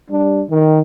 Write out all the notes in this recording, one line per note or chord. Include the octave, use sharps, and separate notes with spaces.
G3 D4
D#3